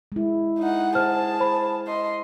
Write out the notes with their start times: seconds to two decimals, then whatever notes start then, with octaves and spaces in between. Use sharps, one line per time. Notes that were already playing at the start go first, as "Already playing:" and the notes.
0.12 G#3 E4
0.59 D#4 F#5
0.95 G#4 C5 F#5 A5 F6
1.40 C5 B5
1.87 D#5 C6